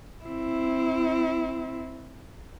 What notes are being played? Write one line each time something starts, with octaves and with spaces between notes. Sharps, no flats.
C4 E4